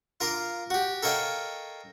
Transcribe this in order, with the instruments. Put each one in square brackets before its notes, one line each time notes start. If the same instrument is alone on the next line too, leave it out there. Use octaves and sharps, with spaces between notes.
[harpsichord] F4 A#4 F5 C6 D6
F#4 G4
A4 A#4 C#5 D#5 F5 G5